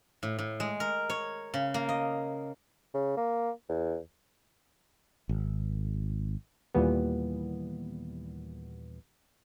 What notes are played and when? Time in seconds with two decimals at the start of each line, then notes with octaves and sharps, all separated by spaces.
0.23 A2
0.39 A2
0.60 G#3
0.80 A#4
1.10 C#5
1.54 C#3
1.74 A#3
1.89 D#5
2.94 C#3
3.17 A#3
3.69 E2
5.29 G#1
6.75 D#2 A#2 E3 G3 B3